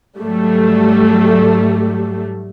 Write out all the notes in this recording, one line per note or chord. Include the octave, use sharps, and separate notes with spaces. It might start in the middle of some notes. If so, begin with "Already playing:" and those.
G#2 F#3 G3 A3